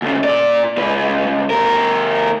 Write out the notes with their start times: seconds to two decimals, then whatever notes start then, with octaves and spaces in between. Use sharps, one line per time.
0.02 D2 C#3
0.24 A#2 D5
0.77 C#2 B4
1.50 D2 A#4